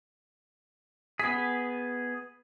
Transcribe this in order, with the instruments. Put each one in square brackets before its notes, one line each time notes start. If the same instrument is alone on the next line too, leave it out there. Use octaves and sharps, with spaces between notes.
[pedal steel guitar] B3 G#4 [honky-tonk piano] B6